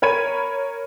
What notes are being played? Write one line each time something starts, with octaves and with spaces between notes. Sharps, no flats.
A#4 C#5 B5 G#6 D#7